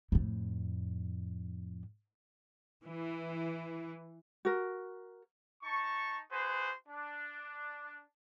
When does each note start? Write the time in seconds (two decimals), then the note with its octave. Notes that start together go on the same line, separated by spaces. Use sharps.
0.12 F2 A2
2.83 E3
4.45 F#4 A#4
5.63 D#4 A5 C#6
6.31 F#4 G#4 B4 C5
6.88 D4